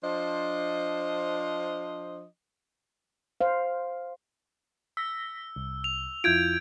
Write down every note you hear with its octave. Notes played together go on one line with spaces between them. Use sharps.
F3 D4 C5 D#5
C5 F5
E6 A#6 B6
C2
F7
F2 E4 F4 G6 G#6 D7